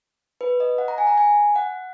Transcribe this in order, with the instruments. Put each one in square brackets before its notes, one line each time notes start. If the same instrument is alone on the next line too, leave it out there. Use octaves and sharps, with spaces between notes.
[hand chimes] B4
D#5
F#5
A#5
G#5
A#5
G#5
F#5